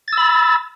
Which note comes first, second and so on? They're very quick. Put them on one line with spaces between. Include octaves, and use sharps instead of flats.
A6 E6 B5